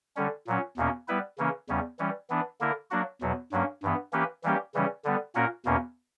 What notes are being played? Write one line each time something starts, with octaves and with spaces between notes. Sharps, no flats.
D3 G3 C#4
A#2 F#3 C#4
E2 B2 A#3 C#4
G3 B3 E4 B4
C#3 E3 A#3 C#4
E2 C#3 G3 C#4
E3 G3 C#4
E3 B3 D4
D3 A#3 E4 A#4
F#3 A#3 D4 F#4
E2 B2 F#3
G2 F#3 A#3 C#4
G2 E3 B3
E3 A#3 C#4 G4 B4
E3 G3 A#3 C#4 G4
C#3 E3 G3 C#4
D3 G3 B3
A#2 A#3 C#4 F#4 A#4
E2 B2 A#3 C#4